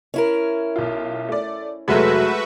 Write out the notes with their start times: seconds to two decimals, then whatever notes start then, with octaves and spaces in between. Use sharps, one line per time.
0.14 C#4 E4 A#4
0.76 B1 F4
1.29 A3 D5
1.88 F1 F#3 G#3 A3 F#4 B4 E5